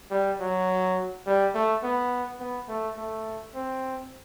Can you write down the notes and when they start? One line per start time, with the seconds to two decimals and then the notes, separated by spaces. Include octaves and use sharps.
0.11 G3
0.40 F#3
1.26 G3
1.55 A3
1.84 B3
2.40 B3
2.68 A3
2.98 A3
3.55 C4